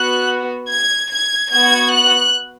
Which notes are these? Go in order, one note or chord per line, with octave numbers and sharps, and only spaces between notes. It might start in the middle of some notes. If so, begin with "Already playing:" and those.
Already playing: B3 F#4 F#6
G#6
G#6
B3 F#4 G#6
F#6